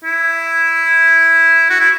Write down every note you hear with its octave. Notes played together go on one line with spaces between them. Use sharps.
E4
F#4
E4